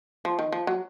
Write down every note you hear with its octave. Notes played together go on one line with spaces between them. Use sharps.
F3
D#3
F3
F#3